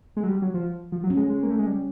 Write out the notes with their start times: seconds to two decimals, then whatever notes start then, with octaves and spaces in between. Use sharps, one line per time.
0.17 G#3
0.23 F#3
0.28 G3
0.42 F#3
0.54 F3
0.92 F3
1.04 F#3
1.10 C#4
1.17 G#3
1.29 G#3
1.43 A#3
1.50 A3
1.59 G#3
1.67 G3